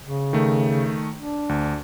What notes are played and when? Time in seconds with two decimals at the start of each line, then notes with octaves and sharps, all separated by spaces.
0.04 C#3
0.33 D#3 A3
1.16 D4
1.49 D2